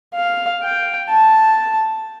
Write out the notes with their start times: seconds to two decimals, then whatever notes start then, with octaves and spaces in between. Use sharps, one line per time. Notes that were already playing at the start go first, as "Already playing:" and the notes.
0.15 F5
0.63 G5
1.10 A5